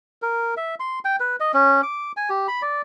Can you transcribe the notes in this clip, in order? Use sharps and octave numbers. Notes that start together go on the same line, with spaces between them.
A#4
E5
C6
G5
B4
D#5
C#4
D6
G#5
G4
B5
D5